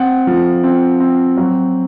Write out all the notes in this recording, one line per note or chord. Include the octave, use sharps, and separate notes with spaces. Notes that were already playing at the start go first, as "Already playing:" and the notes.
Already playing: C4 F#5
F3
C4
C4
F#3